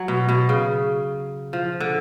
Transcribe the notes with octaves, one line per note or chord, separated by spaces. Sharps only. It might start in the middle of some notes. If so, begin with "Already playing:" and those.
Already playing: F#3
B2
B2
C#3
F3
D3